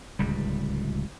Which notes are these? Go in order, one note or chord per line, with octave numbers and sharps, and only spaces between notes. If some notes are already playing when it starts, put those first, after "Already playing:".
D1 C#2 G3